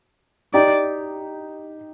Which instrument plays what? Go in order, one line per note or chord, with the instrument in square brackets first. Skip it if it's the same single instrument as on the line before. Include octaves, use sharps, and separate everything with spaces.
[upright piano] D#4 G4 [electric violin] D5